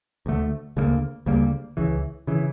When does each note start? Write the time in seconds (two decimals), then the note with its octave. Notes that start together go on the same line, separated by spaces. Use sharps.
0.26 D2 D3 A3
0.77 D2 C#3 G3 A#3
1.26 D2 C#3 G3 A#3
1.77 C#2 C#3 E3
2.27 C#3 E3